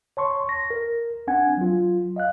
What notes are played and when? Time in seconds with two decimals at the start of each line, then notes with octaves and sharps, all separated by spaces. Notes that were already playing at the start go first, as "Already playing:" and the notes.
0.17 C#5 A5 C6 C#6
0.49 A#6
0.70 A#4
1.27 C4 D4 F#5 G#5 G#6
1.57 F#3 F4
2.16 D#5 F5 F#6